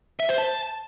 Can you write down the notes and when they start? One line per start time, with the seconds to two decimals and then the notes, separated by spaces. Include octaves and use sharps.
0.20 E5
0.29 C5
0.38 A5